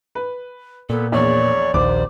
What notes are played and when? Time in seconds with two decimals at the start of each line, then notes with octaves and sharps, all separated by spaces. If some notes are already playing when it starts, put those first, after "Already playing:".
0.15 B4
0.90 A#2 B3 A4
1.12 A#1 E2 C#5 D5
1.74 A#1 D#2 C5 D6